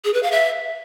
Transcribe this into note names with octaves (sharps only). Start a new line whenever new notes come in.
G#4
B4
F5
E5